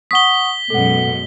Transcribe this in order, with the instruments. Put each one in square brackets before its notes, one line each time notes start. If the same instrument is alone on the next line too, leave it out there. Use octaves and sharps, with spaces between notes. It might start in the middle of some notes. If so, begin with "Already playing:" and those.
[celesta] F#5 C#6 D#6 [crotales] B6 G7
[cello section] F#2 B2 G#3 [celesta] A4 F#5